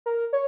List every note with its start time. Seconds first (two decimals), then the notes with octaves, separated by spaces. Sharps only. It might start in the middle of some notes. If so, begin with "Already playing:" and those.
0.06 A#4
0.33 C#5